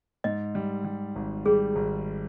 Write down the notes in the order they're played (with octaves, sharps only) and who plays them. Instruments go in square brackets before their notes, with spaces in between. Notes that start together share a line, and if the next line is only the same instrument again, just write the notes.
[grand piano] G#2 [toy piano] D#5
[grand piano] G3
G3
G#1
[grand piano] G3 [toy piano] G#4
[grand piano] G#1